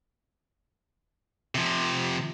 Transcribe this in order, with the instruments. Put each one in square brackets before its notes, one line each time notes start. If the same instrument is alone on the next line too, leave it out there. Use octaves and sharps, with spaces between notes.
[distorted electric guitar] C3 F3